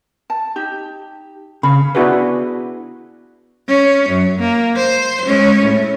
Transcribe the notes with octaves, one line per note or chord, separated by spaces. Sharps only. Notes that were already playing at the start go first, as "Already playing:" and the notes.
A5
D#4 G4
C#3 F5 B5
B3 D4 E4 F#4 G#4 B4
C#4
F#2
A#3
C5
G#3 C#4
A2